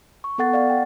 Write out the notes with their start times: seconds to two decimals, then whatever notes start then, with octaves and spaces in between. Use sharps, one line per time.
0.24 C#6
0.38 B3 A4 F#5 A6
0.53 D5 F5 F#5
0.70 G5